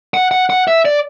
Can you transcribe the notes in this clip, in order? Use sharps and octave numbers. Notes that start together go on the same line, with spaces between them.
F#5
F#5
F#5
E5
D5